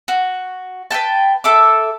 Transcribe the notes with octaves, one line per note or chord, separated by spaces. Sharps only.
F#4
B4 C#5 G5 A5
A4 E5 D6